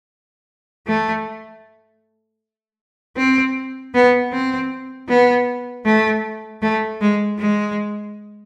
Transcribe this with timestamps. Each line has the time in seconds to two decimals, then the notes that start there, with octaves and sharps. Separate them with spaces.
0.87 A3
3.17 C4
3.94 B3
4.33 C4
5.09 B3
5.85 A3
6.62 A3
7.01 G#3
7.39 G#3